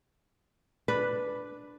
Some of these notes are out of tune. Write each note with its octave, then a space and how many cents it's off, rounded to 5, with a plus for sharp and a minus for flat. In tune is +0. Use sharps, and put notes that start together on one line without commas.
D4 +0 B4 +0